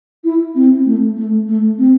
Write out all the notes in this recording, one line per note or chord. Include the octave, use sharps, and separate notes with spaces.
E4
C4
A3
A3
A3
C4